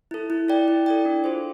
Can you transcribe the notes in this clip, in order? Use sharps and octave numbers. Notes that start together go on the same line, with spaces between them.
E4 A4
E4
A4 D5 G5
E4
A4 D5 G5
D4
F4 G#4 C5